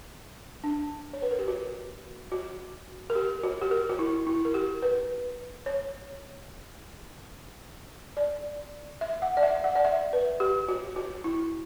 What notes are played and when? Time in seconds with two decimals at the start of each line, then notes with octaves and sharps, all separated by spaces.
0.64 D4
1.13 C#5
1.22 B4
1.31 A#4
1.39 G4
1.48 F#4
2.32 F#4
3.10 A#4
3.15 G4
3.43 F#4
3.62 G4
3.71 A#4
3.89 F#4
3.99 E4
4.27 E4
4.45 A#4
4.54 G4
4.82 B4
5.66 C#5
8.17 D5
9.01 E5
9.22 F#5
9.37 D5
9.43 E5
9.64 F#5
9.75 D5
9.85 E5
10.13 B4
10.40 G4
10.68 F#4
10.96 F#4
11.24 E4